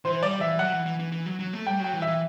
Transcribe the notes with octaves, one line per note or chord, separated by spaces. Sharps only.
E3 C5
G3 D5
E3 E5
F#3 F#5
E3
E3
E3
E3
F#3
F#3
A3
G3 G5
F#3 G5
E3
E5
E3